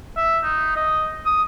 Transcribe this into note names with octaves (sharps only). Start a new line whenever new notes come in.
E5
D#4
D#5
D#6